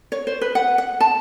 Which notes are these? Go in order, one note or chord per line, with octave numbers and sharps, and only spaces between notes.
C#5
C5
B4
F#5
F#5
A5